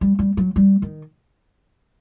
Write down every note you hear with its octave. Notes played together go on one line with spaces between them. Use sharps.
G3
G3
F#3
G3
D#3